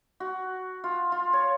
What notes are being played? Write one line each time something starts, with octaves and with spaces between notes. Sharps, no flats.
F#4
F4
F4
C#5